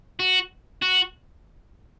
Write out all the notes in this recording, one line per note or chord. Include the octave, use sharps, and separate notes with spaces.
F#4
F#4